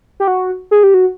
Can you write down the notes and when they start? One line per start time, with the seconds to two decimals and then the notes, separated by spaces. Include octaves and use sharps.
0.20 G4
0.28 F#4
0.71 G#4
0.83 G4
0.94 F#4